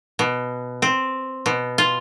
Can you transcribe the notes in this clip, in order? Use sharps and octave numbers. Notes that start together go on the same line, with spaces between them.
B2
C4
B2
F4